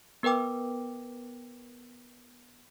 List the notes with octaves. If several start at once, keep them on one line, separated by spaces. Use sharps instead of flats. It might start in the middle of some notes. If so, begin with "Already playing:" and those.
B3 A#4 B4 G5 D6